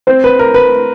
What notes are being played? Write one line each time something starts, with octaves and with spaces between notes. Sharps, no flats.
C4 C5
B4
A#4
B4